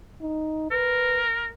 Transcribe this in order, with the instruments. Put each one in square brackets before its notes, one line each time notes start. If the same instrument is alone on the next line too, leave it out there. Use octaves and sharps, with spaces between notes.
[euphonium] D#4
[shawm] A#4 [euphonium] B4